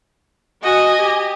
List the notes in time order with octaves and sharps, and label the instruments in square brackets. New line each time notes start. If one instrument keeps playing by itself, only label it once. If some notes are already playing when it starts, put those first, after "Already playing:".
[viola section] F#4 [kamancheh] D#5 G#5
[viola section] G4